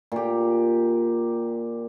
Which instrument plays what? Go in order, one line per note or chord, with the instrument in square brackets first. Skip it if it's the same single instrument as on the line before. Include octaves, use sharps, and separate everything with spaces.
[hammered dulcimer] A#2 G4